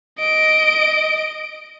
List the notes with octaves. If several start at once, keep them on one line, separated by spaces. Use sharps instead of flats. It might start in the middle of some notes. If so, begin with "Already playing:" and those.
D#5 D7